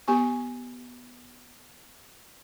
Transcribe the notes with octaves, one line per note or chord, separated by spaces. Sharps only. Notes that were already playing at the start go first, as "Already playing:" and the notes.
B3 G4 G#5 C#6